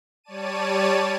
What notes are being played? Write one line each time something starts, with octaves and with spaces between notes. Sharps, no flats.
G3 C#5 D5 A5 D#7